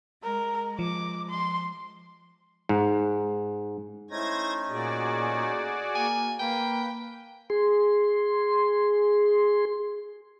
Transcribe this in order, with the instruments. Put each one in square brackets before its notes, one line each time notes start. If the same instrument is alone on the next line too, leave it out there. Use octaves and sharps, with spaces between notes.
[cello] G#3 [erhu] A#4
[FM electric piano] F3 [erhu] D6
[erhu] C6
[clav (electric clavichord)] G#2
[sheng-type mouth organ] A3 C#4 D#4 [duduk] E4 [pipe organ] C5 G#6 A#6
[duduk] A#2 [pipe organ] F#4 G#4 D5
[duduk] A#3 [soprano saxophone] G#5
[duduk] A#3 [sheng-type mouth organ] B4 [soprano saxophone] G5
[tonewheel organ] G#4 C6